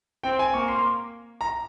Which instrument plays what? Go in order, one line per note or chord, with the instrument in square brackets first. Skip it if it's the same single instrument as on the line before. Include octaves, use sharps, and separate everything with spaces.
[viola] C4 [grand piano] G5
[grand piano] G#5
[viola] A#3 [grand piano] C#6
[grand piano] C6
A#5